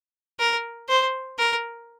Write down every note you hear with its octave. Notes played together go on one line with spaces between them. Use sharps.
A#4
C5
A#4